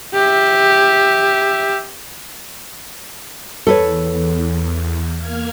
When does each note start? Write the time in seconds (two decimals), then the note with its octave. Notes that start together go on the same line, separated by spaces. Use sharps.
0.14 G4 E5
3.67 E2 A4 B4 C#5
5.17 A#3 F6 G#6